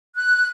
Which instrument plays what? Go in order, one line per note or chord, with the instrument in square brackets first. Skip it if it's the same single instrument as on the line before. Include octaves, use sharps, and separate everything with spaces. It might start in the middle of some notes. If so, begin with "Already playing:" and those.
[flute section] F#6